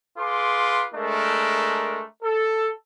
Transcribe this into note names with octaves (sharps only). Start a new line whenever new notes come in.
F4 G#4 B4 C6 D6
G#3 A3 D4 A#4
A4